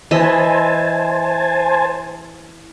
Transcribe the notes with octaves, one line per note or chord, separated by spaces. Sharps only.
E3 C5 D#5 E5 G#5 A5